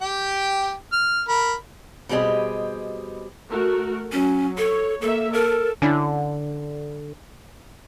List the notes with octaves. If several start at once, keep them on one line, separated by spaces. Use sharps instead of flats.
G4 G5
F6
A#4 B5
B2 G3 C4 G4 G#4 D#5
A3 F#4 A#4
F#3 C#4
A4 C#5
A#3 A4 E5
A4 A#4
D3 C#4 D4 E4